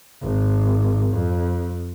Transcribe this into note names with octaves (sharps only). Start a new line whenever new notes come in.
G#1
F2